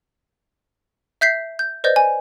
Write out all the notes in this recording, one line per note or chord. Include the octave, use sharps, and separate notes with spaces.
E5 G6 B6 C7
G6
B4 C5 D5 D#5 G6
G#5